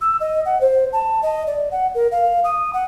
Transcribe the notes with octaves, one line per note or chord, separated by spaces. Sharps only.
E6
D#5
F#5
C5
A5
D#5
D5
F#5
A#4
F5
D#6
F#5